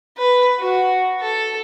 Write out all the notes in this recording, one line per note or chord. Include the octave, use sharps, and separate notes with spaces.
B4
F#4
A4